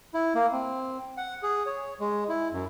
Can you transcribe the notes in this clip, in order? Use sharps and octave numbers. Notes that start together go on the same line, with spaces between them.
E4
A#3
C4
F#5
G#4
C#5
G#3
E4
F#2